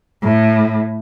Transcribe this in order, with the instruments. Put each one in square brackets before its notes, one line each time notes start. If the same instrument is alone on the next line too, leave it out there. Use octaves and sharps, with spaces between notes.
[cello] A2